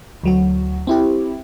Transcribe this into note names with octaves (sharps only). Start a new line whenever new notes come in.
D2 F#3 F#4
C4 E4 G4